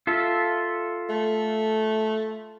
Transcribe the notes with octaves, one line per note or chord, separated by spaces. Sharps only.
F4 A4 E5
A3